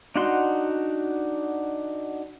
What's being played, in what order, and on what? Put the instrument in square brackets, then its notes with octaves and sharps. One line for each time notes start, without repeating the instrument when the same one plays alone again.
[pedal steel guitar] D4 D#4 F#4 F#5 C6